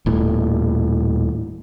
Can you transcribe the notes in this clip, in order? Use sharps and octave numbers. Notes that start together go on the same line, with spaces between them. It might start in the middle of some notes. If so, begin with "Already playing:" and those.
D#1 A2